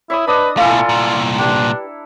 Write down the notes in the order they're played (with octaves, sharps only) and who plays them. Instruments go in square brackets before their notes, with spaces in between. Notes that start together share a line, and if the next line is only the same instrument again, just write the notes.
[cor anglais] E4 [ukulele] C#5 [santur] E5 B5 D#6
[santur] D4 D#5 D#6 [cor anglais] B4
[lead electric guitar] B2 A3 [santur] E4 A4 A#5 [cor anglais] F4 [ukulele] F5 G#5
[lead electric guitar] C2 A#2
[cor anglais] D4 [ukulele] G4 B4